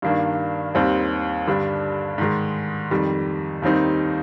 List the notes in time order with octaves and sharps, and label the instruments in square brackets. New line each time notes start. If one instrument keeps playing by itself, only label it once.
[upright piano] G2 D#3 A#3 D4
D#2 D#3 G3 C4
G2 D3 G3 D4
G#2 D#3 G#3
F2 D#3 G3
D#2 D#3 G3 C4 D#4